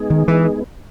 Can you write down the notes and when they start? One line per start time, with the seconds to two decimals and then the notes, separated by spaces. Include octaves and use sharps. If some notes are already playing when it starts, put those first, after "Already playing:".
Already playing: G#3 B3 D#4 G#4
0.10 D#3
0.28 E3